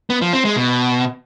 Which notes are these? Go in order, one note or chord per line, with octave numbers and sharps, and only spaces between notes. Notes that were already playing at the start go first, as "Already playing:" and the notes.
B3
F3
C4
G#3
B2